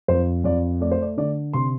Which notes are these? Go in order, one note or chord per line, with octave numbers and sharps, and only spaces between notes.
F2 C5
F2 D5
A3 D5
C5
D5
D3 D5
C3 C6